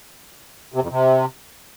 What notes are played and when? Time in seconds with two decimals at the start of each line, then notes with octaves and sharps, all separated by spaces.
0.74 C3
0.83 F2
0.91 C3